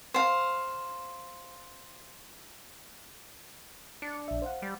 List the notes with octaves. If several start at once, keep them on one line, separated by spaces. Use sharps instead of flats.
C5 F5
D4 C#7
A#1 E5
C5 F5 F#5
G3